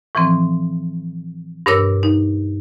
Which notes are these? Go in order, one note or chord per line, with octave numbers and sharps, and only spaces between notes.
A2 E3 F3 C4
G2 B2 D4 A#4 C#5 E6
D#4